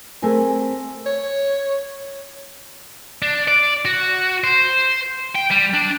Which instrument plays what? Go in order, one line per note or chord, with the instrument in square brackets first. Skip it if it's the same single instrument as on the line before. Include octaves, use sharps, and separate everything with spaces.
[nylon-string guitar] A3 C4 G#4 A#4 G#5
[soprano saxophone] C#5
[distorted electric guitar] D4
D5
F#4
C5
G5
G3
D4